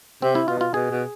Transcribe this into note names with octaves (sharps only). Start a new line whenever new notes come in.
C3 C4
E4
B2 F4
F4
B2 G#4
B2